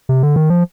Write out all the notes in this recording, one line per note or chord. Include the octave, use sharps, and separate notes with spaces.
C3
D3
D#3
F3